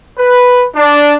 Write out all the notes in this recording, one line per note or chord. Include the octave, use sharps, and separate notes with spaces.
B4
D4